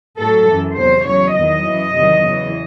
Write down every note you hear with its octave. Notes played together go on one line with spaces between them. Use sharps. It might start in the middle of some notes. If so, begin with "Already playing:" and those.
A2 F#3 A4
F#2 E3
E2 C3 F#3 C5
E2 C#3 F#3 C#5
E2 D#3 F#3 D#5
F#2 E3
E2 C3 D#3 F#3
E2 C#3 E3